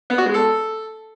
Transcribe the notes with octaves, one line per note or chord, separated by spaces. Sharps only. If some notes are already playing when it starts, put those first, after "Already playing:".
B3
F#4
G#3
A4